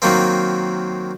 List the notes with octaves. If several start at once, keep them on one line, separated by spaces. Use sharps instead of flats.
D#3 F#3 A#3 C4